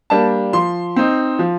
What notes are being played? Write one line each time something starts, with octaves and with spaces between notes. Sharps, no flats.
G3 A#3 D4 A5
F3 C6
C4 D#4
F3